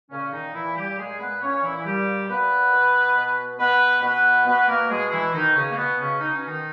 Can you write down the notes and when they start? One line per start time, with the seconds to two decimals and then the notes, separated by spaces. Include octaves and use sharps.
0.10 A#2 C#3 C#4
0.33 D#3 D#4
0.54 A#2 E3 E4
0.77 G3 G4
0.98 A#2 G#3 G#4
1.20 B3 B4
1.42 A#2 C#4 C#5
1.63 E3 E4
1.77 E4
1.85 A#2 G3 G4
2.29 A#2 B3 B4
2.73 B2
3.16 B2
3.59 B2 B3 B4
4.03 B2 B3 B4
4.46 B2 B3 B4
4.68 A#3 A#4
4.90 B2 G#3 G#4
5.12 E3 E4
5.33 B2 D#3 D#4
5.55 C#3 C#4
5.69 A#3
5.77 B2 B3
5.99 C#3 C#4
6.21 B2 D#4
6.35 C#4
6.47 D#3 D#4